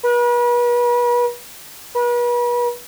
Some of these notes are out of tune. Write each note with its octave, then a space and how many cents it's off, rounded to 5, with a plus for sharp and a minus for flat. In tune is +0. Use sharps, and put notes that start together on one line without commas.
B4 -40
B4 -40